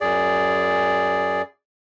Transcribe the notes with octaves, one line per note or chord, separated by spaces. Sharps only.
F#2 G#4 D5